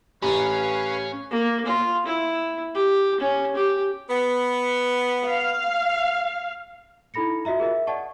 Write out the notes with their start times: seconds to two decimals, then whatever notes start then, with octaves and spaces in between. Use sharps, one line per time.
0.22 A1 C#4 G4 B4 C#5 F5 A#5 B5
1.31 A#3
1.66 F4
2.06 E4
2.75 G4
3.20 C#4
3.55 G4
4.10 B3
5.26 F5
7.14 D#4 E4 A4 B5 A#6 C#7
7.45 F4 F#4 D#5 E5 A#5
7.60 G#4 A#4 D#5 E5
7.87 D5 D#5 F#5 A5 C#6